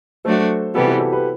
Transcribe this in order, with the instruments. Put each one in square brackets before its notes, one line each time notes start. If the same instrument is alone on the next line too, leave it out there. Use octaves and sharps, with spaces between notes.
[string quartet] F#3 A3 D4 F#4 [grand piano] A4 C5
[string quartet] C3 E3 G3 B3 [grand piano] F#4 A4
[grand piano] E4 G4
F#4 A4
G4 B4